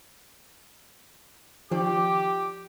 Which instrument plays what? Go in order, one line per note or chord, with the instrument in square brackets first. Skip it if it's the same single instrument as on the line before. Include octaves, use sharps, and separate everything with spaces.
[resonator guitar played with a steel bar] F2 D#3 D5 [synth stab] F3 [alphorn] G4 [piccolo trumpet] D6